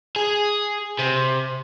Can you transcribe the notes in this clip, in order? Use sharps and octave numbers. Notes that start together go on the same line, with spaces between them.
G#4
C3